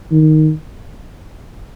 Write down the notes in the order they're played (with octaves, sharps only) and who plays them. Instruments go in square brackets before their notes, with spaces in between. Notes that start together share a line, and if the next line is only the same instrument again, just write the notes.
[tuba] D#3